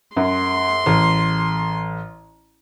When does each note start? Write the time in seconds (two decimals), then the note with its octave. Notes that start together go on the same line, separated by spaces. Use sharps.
0.17 F#2 C6
0.86 A1